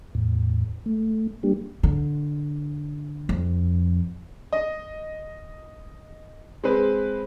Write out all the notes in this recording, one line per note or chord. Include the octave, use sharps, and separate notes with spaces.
E2 A2
A3
G3 A#3 D4 G4
D3
F2
D#5
G#3 C4 B4